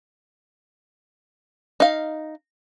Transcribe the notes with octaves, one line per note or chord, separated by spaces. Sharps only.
D#4 F5